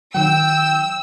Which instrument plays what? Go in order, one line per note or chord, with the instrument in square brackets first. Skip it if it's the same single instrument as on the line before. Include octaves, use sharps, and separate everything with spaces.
[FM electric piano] D#3 F#3 [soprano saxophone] G5 [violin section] E6